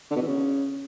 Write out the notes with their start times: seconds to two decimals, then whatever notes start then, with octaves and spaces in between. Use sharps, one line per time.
0.11 D3
0.16 B2
0.22 E3
0.27 C#3